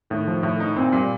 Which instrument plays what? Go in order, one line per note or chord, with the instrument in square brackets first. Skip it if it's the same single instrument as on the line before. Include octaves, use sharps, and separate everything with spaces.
[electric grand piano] A2 [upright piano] D#3
[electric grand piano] F3
A2
D#4
[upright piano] A#2 [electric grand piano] C4
[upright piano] A#2 [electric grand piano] G3